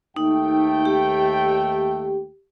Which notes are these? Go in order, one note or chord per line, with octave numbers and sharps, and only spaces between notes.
D#2 A3 D#4 G5
G4